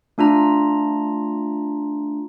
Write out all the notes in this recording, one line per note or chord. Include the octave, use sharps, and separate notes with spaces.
A3 D4 F4 A#5